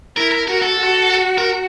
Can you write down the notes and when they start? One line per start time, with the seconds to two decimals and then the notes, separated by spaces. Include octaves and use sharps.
0.16 E4 A#4
0.31 A#4
0.48 F#4 A#4
0.62 A4
0.78 F#4
1.38 A#4